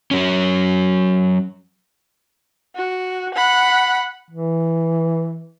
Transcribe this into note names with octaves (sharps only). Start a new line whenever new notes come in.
F#3 C#4
F#4
F#5 B5
E3